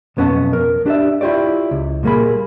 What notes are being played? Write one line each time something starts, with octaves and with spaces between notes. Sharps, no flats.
B1 F2 B3 C#4 F#5 A5
A#4
D4 G4 C5 D5 E5
E4 F4 G4 C#5 D5
C#2
A#2 G3 A#3 G#4 B5